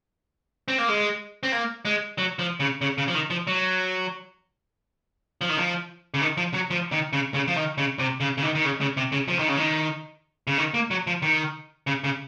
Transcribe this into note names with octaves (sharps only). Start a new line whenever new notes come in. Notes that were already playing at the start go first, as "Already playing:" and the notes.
C4
A#3
G#3
C4
A#3
G#3
F#3
F3
C#3
C#3
C#3
F3
D#3
F3
F#3
F3
D#3
F3
C#3
D#3
F3
F#3
F3
D#3
C#3
C#3
F3
D#3
C#3
C3
C#3
C#3
D#3
D#3
C#3
C#3
C3
C#3
F3
D#3
C#3
D#3
C#3
D#3
A#3
F#3
F3
D#3
C#3
C#3